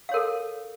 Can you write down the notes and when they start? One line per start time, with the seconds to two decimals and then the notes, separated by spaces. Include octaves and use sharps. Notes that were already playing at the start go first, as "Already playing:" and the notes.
0.09 F5
0.11 C#5
0.14 A#4
0.16 A4